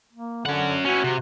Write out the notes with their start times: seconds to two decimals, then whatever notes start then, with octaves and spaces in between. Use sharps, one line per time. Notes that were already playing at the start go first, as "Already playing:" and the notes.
0.13 A#3
0.45 D3 C#4 F#5
0.85 C#4 E4 F#4
1.04 C3